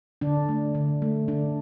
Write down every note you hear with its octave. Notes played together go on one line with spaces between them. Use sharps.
D3 D4
A3
D3
A3
D3 D4